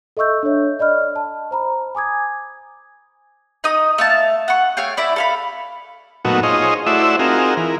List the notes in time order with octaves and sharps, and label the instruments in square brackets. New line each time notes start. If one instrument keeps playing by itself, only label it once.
[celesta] A4 D#5 E5 C#6 E6 G6
D4 A4 C#5 E5
D5 D#5 B5 F6
A5
C5 A#5 B5
G#5 D6 D#6 G#6
[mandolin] D#4 D#5 D#6
A3 F5 A5
F#5 C#6
A3 C#5 F5 G5
E4 D5 E5
A4 F5 B5
[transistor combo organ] A#2 F#3 A3 B3 D#4 F#4
D#4 F4 G#4 C5 C#5 D#5
A3 E4 F#4 C5 D5 E5
C4 D#4 F4 F#4 G#4 A#4
E3 A#4